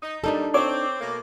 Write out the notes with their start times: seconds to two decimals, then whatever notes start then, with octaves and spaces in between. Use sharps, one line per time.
0.02 D#4
0.24 A#2 G3 D4 D#4 A4
0.54 C4 C#5 D6
1.01 B2 A3 A#3